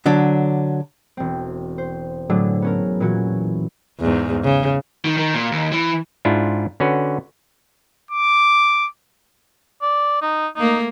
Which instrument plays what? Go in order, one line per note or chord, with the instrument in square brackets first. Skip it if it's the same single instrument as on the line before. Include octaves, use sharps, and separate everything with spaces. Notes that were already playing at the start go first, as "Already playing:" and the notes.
[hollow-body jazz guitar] D3 F#3 D4
[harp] E1 C4
C5
A2 D3 F#3 A3 D4 G#4
B3 C#4 A#4
A#2 E3 C#4 F#4 G#6
[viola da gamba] E2 G#2
C#3
[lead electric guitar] D#3
D#3
A#2
D#2
E3
[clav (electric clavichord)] G#2 D4 E4 F4
D3 C#4 F#4 B4
[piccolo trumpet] D6
[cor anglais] D5
D#4
[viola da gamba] A3 A#3 [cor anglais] D#4